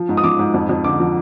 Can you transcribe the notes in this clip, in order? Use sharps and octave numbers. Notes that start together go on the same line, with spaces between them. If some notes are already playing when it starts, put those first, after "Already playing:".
Already playing: F3
G#2
D#6
F3 D6
G#2
F2
F2
D3 D6
F3